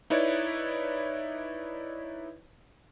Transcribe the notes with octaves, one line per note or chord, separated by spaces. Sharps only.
D#4 E4 B4 C#5 D5